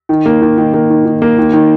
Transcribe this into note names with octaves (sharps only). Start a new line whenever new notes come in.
D#3
A#3
D#3
D#3
A#3
D#3
D#3
A#3
D#3
D#3